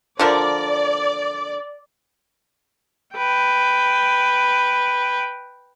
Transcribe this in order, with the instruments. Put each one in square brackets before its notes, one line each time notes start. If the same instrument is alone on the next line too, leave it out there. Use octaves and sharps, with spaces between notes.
[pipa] D3 F3 A#4 [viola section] D5
[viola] B4 G5